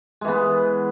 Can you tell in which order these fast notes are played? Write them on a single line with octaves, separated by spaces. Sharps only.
G#3 E3 B3